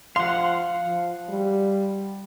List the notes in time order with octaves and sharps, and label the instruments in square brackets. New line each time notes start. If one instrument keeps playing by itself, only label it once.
[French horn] F3 [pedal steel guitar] F5 F#5 [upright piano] C6
[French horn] F3
G3